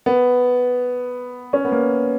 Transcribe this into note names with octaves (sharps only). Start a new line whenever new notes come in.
B3
C#4
B3
A#3